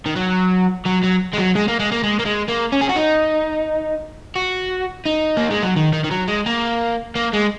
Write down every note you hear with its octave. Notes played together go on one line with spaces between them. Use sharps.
D#3
F#3
F#3
F#3
G#3
F#3
G#3
A#3
G#3
A#3
G#3
A#3
G#3
A#3
C#4
G#4
F#4
D#4
F#4
D#4
A#3
G#3
F#3
D#3
D#3
D#3
F#3
G#3
A#3
A#3
G#3